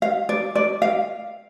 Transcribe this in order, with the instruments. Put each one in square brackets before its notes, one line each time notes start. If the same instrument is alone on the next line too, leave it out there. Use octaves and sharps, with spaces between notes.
[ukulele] F5
D5
D5
F5